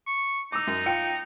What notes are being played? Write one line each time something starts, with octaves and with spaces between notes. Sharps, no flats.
C#6
D#4 D6 E6
F#2
F4 G5 C#7